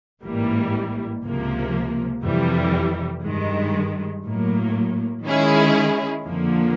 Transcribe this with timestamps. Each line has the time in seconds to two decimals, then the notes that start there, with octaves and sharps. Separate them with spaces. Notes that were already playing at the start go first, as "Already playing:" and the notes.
0.23 A1 G#2 E3 G3 A#3
1.23 C#2 C3 F3 A#3
2.23 F2 C3 E3 G3
3.23 G2 D#3 G#3
4.24 A2 F#3 A#3
5.24 D#3 G#3 C#4 E4 G#4
6.25 F2 D3 F3 A#3